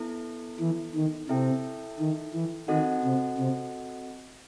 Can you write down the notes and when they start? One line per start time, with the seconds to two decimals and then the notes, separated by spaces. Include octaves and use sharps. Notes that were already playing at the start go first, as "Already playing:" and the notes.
Already playing: B3 E4 A4
0.60 E3
0.95 D#3
1.29 C3 E4 A4 E5 G5
2.00 D#3
2.34 E3
2.68 D#3 C4 F#4 A4 D#5 F#5
3.04 C3
3.38 C3